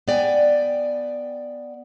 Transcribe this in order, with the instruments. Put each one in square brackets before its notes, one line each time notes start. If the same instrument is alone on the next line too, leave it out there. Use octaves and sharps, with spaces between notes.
[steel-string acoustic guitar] B3 D5 G5 G#5